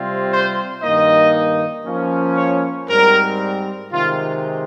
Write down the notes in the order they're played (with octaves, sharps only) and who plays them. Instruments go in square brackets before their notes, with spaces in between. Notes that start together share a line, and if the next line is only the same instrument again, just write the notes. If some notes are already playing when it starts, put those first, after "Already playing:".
Already playing: [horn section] C3 G3 C4 F4
C5
G2 D#3 A#3 D#4 D#5
F3 A#3 C#4
C#5
G#2 G3 C4 A#4
C3 D#3 G#3 F4